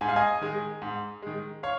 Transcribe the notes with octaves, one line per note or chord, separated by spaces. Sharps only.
G#2 G#5
F5
D#5 G#5
D#3 G#3
G#2
D#3 G#3
C#5 F5